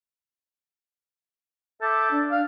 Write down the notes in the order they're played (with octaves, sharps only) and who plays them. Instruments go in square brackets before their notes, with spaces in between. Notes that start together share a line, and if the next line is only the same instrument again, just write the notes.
[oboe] A4 [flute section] E5 D6 G6
[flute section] D4
[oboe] F5